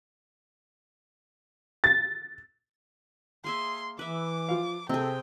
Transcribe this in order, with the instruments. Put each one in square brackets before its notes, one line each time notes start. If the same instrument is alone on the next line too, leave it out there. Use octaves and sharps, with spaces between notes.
[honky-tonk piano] A6
[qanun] A#3 G#4 E5 [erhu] C6
[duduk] E3 [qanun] B4 E5 [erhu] D6
[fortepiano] F3 F4 F5
[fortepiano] C3 [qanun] C4 G#4 [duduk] A4 [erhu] G5